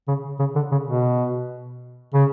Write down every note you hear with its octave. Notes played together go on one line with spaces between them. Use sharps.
C#3
C#3
D3
C#3
B2
C#3